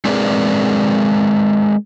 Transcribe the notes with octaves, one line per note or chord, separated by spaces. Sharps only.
G#3 C4 G#4 A#4 B4 D5